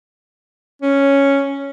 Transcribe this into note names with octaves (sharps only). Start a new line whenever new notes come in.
C#4